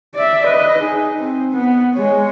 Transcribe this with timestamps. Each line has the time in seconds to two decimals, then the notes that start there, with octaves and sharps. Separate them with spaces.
0.14 D5 E5
0.46 B4 D#5
0.79 D#4 G#4
1.19 C4
1.53 B3
1.95 G#3 C#5